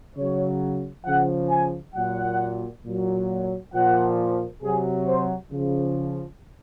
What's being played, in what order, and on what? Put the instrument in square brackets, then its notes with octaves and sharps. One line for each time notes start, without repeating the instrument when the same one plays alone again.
[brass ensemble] C#3 F#3 C#5
C#3 F3 F#5
G#5
A#2 F#3 F#5
A#2 F#3
A#2 F3 F#5
C3 F#3 G#4
C5
C#3 F3